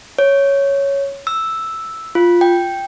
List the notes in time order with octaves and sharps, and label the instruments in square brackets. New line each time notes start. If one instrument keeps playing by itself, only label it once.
[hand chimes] C#5
E6
F4
G5